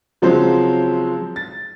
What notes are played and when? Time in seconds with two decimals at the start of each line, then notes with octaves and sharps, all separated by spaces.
0.22 C#3 F3 F#3 G#3 C4 C5
1.36 A6